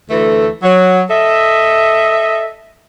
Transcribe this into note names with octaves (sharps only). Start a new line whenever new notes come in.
D2 E3 A3 A4
F#3
A4 D#5 E5